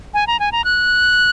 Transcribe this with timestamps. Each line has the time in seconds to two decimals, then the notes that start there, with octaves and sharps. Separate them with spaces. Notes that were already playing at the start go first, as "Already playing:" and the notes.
0.14 G#5
0.27 A#5
0.40 G#5
0.52 A#5
0.64 F#6